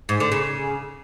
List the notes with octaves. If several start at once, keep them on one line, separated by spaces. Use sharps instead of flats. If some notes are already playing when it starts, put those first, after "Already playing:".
G#2
D3
C#3